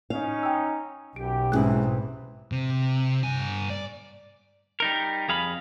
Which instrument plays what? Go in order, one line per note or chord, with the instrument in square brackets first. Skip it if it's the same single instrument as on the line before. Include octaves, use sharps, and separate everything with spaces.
[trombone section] C#4 D#4 [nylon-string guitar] F5
[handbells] G5 E6
[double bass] B1 [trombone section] F#2 G4 [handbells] D7
[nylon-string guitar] D#2 G#2 [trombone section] C3 E3 [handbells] C#4 G#4 F#6
[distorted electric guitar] C3
G2 G#5
D5
[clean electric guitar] G3 D#4 A#4
F2 G#4 F5 B5